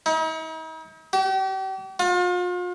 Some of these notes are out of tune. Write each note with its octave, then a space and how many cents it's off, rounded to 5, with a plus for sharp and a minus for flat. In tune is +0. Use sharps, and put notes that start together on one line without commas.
D#4 +45
G4 -40
F4 +40